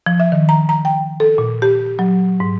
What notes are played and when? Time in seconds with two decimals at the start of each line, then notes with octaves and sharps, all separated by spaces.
0.06 F3
0.20 E5
0.32 D#3
0.49 A#5
0.69 A#5
0.85 G5
1.20 A4
1.38 A#2
1.62 G4
1.99 F#3
2.40 G#2